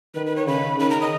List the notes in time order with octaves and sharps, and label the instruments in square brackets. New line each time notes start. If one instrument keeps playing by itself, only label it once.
[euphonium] D#3 [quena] B4
[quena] B4
C#5
[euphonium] C#3 [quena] B5
[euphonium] D#3 [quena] B5
[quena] A#5
D#5